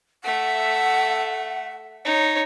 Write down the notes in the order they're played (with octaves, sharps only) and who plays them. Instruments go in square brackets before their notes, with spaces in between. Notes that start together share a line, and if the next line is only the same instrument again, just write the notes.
[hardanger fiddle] A3 E5 [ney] F#5
[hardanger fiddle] D#4 C#5